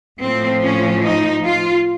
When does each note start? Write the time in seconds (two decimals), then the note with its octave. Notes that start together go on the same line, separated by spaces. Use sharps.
0.21 A2 F3 C4
0.63 C#4
1.04 D#4
1.45 F4